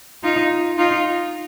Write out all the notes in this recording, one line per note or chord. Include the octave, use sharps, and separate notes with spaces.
D#4 F4
D#4 F4